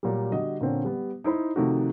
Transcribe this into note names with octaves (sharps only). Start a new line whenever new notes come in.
A#2 F#3 G3
D3 G3 F#4 D#5
A#2 D3 C4 C#4
G3 B3
D#4 E4 C5 B5
C3 D#3 F3 A3 D#4 F#4